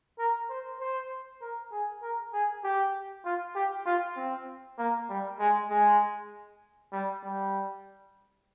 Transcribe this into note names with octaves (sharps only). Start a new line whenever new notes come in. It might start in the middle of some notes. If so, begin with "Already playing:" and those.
A#4
C5
C5
A#4
G#4
A#4
G#4
G4
F4
G4
F4
C4
A#3
G3
G#3
G#3
G3
G3